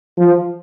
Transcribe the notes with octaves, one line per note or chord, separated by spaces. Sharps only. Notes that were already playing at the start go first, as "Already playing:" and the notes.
F3